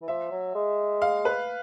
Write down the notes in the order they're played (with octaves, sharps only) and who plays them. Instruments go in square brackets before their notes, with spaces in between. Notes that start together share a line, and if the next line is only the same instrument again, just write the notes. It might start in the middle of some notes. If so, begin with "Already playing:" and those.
[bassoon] E3
[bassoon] F3 [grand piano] E5
[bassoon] F#3
G#3
[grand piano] F5
B4